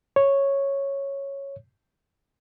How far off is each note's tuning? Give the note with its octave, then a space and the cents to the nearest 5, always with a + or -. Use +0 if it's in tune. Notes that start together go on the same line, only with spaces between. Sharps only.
C#5 -5